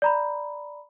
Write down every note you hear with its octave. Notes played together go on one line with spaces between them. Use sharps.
D5 A#5 B5